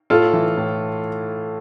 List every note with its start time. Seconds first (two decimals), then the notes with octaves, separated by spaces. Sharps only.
0.10 A2 F4 A4
0.33 E3
0.57 A2